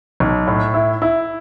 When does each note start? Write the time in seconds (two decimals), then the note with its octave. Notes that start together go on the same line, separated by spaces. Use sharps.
0.20 B1
0.47 A2
0.74 E4
1.02 E4